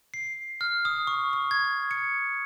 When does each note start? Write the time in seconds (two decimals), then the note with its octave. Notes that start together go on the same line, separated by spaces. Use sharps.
0.14 C7
0.61 F6
0.85 D#6
1.07 C#6
1.33 C#6
1.51 G#6
1.91 C#7